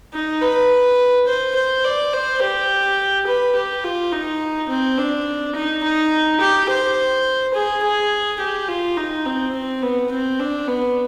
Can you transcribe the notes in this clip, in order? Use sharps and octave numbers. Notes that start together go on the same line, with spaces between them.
D#4
B4
C5
C5
D5
C5
G4
B4
G4
F4
D#4
C4
D4
D#4
D#4
G4
C5
G#4
G#4
G4
F4
D#4
C4
C4
B3
C4
D4
B3